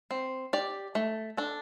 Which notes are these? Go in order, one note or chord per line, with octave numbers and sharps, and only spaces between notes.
C4
G4 D5
A3
D4 A4